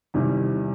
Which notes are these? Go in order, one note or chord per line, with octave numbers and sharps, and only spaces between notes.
E2 C3 D#3 G3